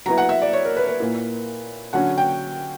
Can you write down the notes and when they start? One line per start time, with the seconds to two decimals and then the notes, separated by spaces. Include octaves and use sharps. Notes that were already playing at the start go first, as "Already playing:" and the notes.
0.06 F#3 B3 E4 A#5
0.18 F#5
0.29 E5
0.42 D5
0.53 C#5
0.65 A#4
0.77 B4
0.87 B4
1.00 A#2 A#3 E4
1.93 D3 F#3 C#4 F#5
2.18 G5